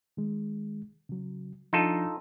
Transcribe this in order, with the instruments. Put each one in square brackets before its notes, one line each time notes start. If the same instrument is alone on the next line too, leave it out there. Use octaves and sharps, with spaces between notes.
[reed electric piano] D#3 G#3
C#3 F#3
[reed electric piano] F3 D4 [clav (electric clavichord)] D#4 F4 A4